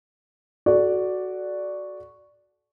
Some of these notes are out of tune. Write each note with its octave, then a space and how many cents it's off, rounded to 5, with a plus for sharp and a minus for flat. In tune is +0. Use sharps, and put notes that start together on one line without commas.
F#4 +0 A4 -30 D5 +0